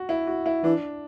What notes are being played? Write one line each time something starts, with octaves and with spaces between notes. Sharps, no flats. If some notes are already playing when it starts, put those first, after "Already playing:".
Already playing: F#4
E4
F#4
E4
E3 D4